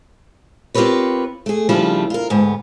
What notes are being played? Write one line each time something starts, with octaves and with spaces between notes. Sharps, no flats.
C4 F4 G4 A#4 B4 C#5
A3 G#4
C#3 F3 G3 D4 E4 F4
F4 A#4
D2 G#2 B3